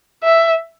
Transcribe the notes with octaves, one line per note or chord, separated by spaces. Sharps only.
E5